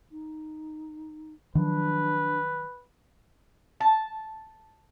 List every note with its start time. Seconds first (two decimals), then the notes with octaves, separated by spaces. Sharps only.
0.11 D#4
1.55 D#3 F3 F#3 D4 B4
3.80 A5